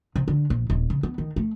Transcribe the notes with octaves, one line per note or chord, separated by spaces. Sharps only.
C3
D3
A#1
D#1
C#3
B3
D#3
A3